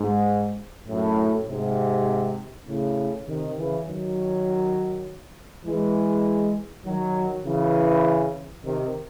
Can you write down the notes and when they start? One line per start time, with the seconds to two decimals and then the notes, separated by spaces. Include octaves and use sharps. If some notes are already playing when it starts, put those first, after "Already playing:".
Already playing: G#2
0.88 F#2 A2
1.48 G#2 C3
2.67 A2 C#3
3.27 C3 D#3
3.57 C#3 E3
3.86 D#3 F#3
5.65 E3 G#3
6.85 D#3 F#3
7.45 C#3 E3
8.63 C3 D#3